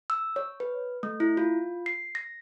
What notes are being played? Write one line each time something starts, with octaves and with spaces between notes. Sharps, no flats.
E6
C#5
B4
A3
E4
F4
C7
A#6